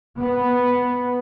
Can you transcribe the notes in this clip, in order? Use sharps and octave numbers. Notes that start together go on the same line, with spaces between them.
B3